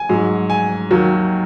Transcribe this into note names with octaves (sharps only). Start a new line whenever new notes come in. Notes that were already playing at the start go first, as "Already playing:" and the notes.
Already playing: G#5
G#2 F#3
G#5
D#2 D#3 F#3